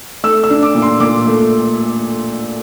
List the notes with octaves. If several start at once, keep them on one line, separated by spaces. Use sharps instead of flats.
A3 E6
E6
D4
D6
A#2
C6
A#2 D6
A3